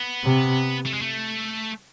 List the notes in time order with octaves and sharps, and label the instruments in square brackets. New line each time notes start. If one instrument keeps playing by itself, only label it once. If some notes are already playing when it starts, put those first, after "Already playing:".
Already playing: [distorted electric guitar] B3
[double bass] C3
[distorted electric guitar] A3
G#3
A3